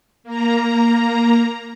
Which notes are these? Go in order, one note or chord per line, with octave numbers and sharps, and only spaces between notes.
A#3 A#5